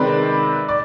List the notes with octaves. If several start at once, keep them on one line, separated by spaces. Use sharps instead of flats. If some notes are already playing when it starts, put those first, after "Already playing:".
Already playing: C3 D#3 G#3 C4 B4 D5
D5